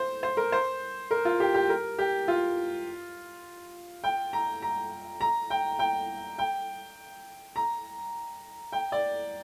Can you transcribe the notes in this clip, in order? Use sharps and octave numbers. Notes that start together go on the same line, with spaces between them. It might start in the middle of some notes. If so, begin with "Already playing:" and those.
Already playing: C5
C5
A#4
C5
A#4
F4
G4
G4
A#4
G4
F4
G5
A#5
A#5
A#5
G5
G5
G5
A#5
G5
D5